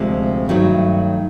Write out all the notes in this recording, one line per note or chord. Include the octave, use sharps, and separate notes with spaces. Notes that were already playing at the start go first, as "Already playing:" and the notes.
Already playing: D2 C3 F3 G#3
G2 D#3 F#3 A3